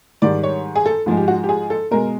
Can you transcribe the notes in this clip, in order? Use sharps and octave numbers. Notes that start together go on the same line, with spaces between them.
G#2 D#3 G3 D5
C#5
G#4
A4
G#2 F3 G#3
G4
F#4
G4
G#4
A4
B2 G#3 A#4